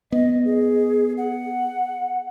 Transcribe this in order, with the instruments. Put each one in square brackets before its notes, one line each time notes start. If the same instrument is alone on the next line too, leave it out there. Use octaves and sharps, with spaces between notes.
[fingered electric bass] B3 [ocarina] D#5
[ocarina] G#4
F#5